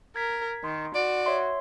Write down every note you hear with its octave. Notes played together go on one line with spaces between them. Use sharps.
A#4 G#6 B6
D#3 C6
F#4 D5
C#5 E5 C6